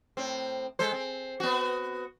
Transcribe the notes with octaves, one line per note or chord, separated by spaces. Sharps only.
A2 C4
G#3 A4 C5
C4
B3 F#4